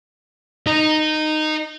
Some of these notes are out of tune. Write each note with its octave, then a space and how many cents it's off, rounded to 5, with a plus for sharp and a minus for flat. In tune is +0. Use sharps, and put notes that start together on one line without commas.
D#4 -10